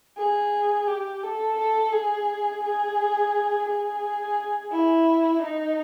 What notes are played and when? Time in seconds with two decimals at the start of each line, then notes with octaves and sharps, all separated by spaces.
0.18 G#4
0.88 G4
1.23 A4
1.58 A4
1.93 G#4
2.63 G#4
3.68 G#4
4.72 E4
5.42 D#4